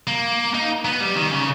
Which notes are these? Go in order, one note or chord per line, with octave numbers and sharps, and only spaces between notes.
A#3
D#4
B3
G3
D#3
C#3